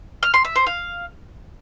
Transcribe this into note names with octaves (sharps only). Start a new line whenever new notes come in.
F6
C6
E5
C5
F5